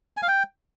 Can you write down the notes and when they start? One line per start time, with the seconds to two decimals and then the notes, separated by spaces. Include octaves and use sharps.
0.17 G#5
0.22 F5
0.28 G5